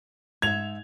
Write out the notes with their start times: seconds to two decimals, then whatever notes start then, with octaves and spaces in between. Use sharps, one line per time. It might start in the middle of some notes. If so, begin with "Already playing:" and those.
0.42 G#2 A4 E5 G#6 F7